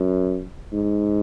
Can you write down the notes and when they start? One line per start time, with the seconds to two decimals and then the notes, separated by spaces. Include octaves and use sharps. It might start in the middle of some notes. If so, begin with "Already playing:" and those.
Already playing: F#2
0.72 G#2